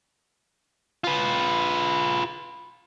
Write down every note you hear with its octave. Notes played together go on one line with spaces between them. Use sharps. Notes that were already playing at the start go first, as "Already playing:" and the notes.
F4 B4